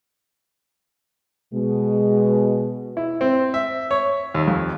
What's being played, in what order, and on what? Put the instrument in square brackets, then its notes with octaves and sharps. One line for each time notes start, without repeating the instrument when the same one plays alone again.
[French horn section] B2 G#3
[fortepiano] E4
C4
E5
C#5
D#2
F2